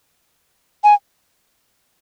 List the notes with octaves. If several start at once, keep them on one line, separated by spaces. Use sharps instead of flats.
G#5